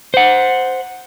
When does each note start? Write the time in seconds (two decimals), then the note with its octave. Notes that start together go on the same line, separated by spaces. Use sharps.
0.14 C5 F#5